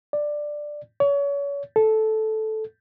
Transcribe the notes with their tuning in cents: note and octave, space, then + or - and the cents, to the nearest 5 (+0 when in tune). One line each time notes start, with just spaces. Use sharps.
D5 +10
C#5 +35
A4 -10